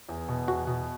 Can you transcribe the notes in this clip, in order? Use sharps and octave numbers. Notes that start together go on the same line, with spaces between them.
E2
B2
E2 F#4
B2